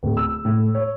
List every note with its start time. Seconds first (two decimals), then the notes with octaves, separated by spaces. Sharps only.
0.03 D1
0.17 E6
0.45 A2
0.75 C#5